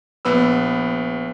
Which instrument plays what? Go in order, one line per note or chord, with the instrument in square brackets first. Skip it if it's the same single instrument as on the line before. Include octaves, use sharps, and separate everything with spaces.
[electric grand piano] A#1 B3 B4 E6